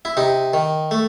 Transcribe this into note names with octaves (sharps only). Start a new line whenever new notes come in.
E4
C3 D#4
D#3
A3